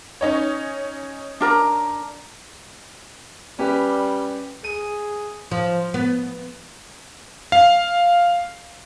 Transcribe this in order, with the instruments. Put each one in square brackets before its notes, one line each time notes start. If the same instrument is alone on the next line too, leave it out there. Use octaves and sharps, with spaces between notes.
[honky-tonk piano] C#4 D#4 C#5
[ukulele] D4 A#4 A#5
[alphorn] G3 [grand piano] C#4 G4 B4
[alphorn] G#4 [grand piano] D#7
[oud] F3
B3
[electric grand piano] F5